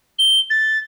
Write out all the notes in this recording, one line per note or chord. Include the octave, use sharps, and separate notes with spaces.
G7
A6